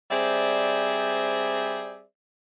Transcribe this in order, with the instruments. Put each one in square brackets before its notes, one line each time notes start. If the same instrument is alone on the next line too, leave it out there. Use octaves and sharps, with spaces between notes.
[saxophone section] G3 C4 G#4 C5 D5 E5